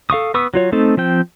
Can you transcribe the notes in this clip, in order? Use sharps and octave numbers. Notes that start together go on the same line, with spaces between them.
A4 F5 C#6 D#6
B3 B4 C#6 D#6 E6
F#3 F4 C#5
A3 C4 D#4 A4
F3 C4 G5